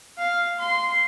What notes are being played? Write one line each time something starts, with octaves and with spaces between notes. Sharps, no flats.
F5
C6